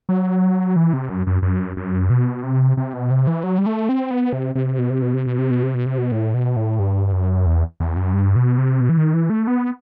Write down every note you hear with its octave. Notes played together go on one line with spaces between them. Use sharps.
F#3
E3
C3
F#2
F#2
F#2
F#2
B2
C3
C3
B2
C3
E3
F#3
G3
A3
C4
B3
C3
C3
B2
C3
B2
C3
B2
C3
B2
C3
B2
C3
B2
A2
B2
A2
G2
F#2
E2
E2
F#2
G2
B2
C3
B2
E3
D#3
E3
A3
B3